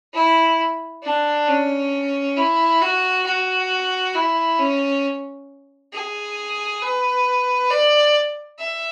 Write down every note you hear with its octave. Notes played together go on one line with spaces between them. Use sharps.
E4
D4
C#4
E4
F#4
F#4
E4
C#4
G#4
B4
D5
E5